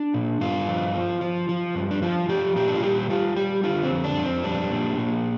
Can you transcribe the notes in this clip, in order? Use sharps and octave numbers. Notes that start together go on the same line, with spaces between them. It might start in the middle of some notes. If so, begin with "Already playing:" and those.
Already playing: D4
A#2
G2 F4
F3
F3
F3
F3
G2
D4
F3 F4
F3 G4
A#2 G4
D4
F4
G3 G4
G3 F4
G3 G4
D3 F4
C4
F2
D4
F2
C4
G3 D4
A#2
A#2